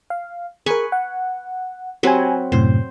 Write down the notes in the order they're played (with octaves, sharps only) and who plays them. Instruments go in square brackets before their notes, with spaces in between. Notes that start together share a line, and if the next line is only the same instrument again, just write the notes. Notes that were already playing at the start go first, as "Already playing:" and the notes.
[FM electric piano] F5
[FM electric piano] G#4 A#4 [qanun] B4 G#5 C#6
[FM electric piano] F#5
[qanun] F#3 C4 B4 [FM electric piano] G4 G#5
[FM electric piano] F#2 A2 C3 [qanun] C5